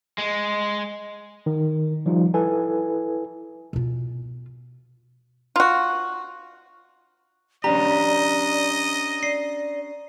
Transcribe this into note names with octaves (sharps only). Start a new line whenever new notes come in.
G#3
D#3
F3 G3 D#4 F4
E4 A4 B4 G#5
B2 F4
F4 F#4
C#4 D4 G4 D5 D#5 A#5
D5 C7